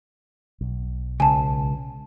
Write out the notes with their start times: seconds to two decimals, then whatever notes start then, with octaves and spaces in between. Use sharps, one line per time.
0.61 B1
1.20 C#2 G#5 A5